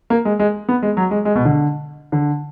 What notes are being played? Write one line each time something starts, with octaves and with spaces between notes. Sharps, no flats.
A#3
G#3
G#3
B3
G#3
F#3
G#3
G#3
B2
D3
D3